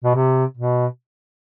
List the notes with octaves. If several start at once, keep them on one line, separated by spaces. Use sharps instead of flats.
B2
C3
B2